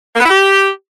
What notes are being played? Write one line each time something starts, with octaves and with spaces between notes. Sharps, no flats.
A#3
B3
E4
G4